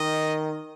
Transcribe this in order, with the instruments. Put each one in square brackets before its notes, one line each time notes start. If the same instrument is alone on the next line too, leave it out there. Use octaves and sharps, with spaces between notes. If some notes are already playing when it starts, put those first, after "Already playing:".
Already playing: [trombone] D#3 [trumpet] D#5